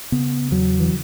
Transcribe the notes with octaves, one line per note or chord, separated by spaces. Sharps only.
C#3 B3
E2 F#3
E3